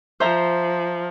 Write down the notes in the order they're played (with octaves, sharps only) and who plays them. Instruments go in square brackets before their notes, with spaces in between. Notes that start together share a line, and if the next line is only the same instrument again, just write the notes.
[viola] F3 [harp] C5 E5 A#5